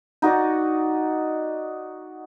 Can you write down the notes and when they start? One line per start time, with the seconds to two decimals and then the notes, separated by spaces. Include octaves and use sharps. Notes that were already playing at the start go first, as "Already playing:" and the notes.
0.22 D#4 F#4 D5